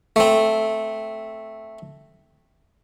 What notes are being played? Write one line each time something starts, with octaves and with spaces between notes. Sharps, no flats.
A3 C4